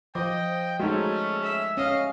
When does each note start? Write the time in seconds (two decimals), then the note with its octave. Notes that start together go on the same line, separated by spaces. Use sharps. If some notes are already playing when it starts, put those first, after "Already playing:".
0.15 F3 D#5 G5 D6
0.80 G#3 A3 C#4 D#4 F#4
1.42 E5
1.77 C#4 D#5 F5